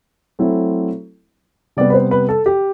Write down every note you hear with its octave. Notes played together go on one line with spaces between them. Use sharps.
F#3 A3 C4 E4
C3 G3 B3 D5
B4
C5
B4
A4
G4